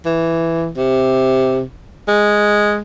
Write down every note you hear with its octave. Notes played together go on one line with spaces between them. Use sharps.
E3
C3
G#3